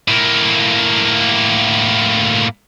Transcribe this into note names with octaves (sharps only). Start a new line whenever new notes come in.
A2 A#3